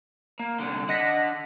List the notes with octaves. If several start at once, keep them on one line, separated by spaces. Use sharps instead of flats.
A#3
C2 D3
D4 D#5 F#5 A#6 B6